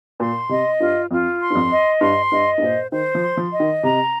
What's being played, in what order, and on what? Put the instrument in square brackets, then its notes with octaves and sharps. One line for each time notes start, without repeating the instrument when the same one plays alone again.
[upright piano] A#2 [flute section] C6
[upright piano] C3 [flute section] D#5
[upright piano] G2 [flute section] F4
[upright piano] F2 [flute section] F4
[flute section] C6
[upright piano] G2
F2
[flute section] D#5
[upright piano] G2 [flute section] C6
[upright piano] G2 [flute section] D#5
[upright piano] G2
[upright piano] A#2 [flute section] C5
[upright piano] D#3 [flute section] C5
[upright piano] F3
[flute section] C6
[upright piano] F3
[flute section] D#5
[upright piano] D#3
[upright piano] C3 [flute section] A#5